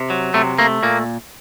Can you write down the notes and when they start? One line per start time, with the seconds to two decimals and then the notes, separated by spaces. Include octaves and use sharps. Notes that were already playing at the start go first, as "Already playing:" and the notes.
Already playing: C3
0.10 F#3
0.34 C3 A3
0.59 A3 A#3
0.83 A#2 A#3